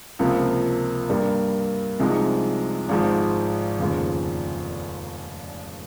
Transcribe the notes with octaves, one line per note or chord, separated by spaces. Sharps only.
C#2 C3 F3 A#3
G2 G3 A#3
C2 C3 F3 G#3 D#4
G#1 G#2 F3
F1 D#2 C#3 F3